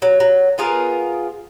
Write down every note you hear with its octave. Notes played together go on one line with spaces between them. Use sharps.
F#3
F#3
B3 F4 G#4 A#4